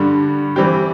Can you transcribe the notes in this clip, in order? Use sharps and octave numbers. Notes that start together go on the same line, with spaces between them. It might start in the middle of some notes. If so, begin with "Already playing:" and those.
Already playing: G2 D3 G3
E3 G3 C4 G4